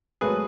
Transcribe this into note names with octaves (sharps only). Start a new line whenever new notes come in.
G#1 G#2 F#3 A3 G#4 B4